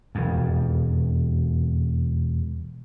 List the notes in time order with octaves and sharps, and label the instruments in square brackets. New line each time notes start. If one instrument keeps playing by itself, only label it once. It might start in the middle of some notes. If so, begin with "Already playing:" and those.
[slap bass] E1 F2